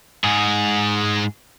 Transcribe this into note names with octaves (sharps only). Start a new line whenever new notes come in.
G#2 G#4